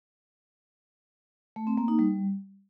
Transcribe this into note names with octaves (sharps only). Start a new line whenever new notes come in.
A3
C4
A#3
D#4
G3